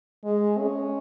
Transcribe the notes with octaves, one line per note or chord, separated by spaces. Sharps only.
G#3
C#4